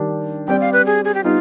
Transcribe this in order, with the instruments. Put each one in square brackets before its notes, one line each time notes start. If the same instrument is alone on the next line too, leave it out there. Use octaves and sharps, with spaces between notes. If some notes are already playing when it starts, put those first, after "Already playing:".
Already playing: [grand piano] D#3 G3 D4 G4
[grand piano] G3 C4 G4 D5 [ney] G5
[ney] F5
B4
G#4
G#4
G4
[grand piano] G3 B3 D#4 [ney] F4